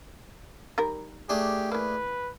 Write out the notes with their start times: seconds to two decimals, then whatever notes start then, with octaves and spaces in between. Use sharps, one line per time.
0.78 D#3 G3 A#4
1.29 A3 D4 G4 G#4
1.72 E3 A#3 B4